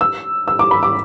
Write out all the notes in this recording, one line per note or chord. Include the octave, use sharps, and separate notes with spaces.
E6
E6
D6
B5
D6